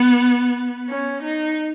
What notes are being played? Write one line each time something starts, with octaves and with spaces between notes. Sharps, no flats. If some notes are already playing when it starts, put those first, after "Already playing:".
Already playing: B3
C#4
D#4